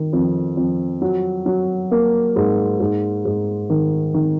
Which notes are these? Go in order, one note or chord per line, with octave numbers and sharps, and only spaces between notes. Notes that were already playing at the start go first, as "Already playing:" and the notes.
Already playing: D#3
F2
F2
F#3
F#3
A#3
G#2
G#2
G#2
D#3
D#3